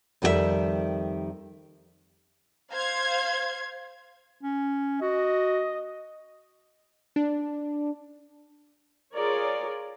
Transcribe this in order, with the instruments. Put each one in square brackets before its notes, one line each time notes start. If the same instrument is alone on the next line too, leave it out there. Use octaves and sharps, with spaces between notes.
[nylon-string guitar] F2 D#3 G3 E4 A#4 E5
[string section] C5 F5 G#6
[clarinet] C#4
[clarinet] F#4 [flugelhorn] D#5
[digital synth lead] D4
[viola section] F4 G#4 A#4 C#5 D5